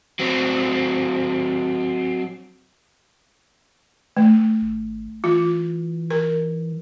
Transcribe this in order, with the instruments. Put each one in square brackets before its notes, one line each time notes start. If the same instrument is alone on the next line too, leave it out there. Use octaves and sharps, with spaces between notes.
[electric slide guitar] F#3 C4
[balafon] A3
[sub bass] G#1
[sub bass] E3 [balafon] F4
[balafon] A#4